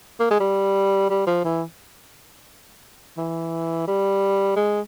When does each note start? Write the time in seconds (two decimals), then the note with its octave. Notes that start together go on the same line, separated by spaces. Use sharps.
0.20 A#3
0.30 G#3
0.40 G3
1.10 G3
1.27 F3
1.45 E3
3.18 E3
3.88 G3
4.56 G#3